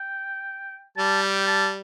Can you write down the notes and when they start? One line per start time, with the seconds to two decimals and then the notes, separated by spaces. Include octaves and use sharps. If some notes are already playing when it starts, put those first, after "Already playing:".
Already playing: G5
0.97 G3 A5
1.23 G5
1.47 A5